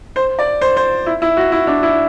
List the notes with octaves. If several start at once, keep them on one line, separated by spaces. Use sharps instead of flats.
C5
D5
C5
C5
E4
E4
F#4
E4
D4
E4